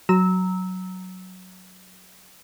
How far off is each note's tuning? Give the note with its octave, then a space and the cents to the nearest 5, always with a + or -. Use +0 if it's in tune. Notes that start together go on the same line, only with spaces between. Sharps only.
F#3 +0 A#5 -10 E6 -20